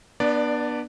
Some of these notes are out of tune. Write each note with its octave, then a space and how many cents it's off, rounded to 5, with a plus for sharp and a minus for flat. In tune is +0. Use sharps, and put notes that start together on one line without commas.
B3 -25 D4 +20 D5 -5